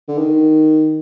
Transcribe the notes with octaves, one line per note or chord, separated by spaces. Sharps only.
D3
D#3